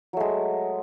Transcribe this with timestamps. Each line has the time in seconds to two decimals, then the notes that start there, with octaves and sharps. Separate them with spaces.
0.13 F#3
0.17 A3
0.20 G#3